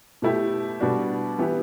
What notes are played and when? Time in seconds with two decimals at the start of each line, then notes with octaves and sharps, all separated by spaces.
0.22 B2 A3 E4 G4
0.80 B2 G3 D4 F#4
1.38 E3 B3 E4 G4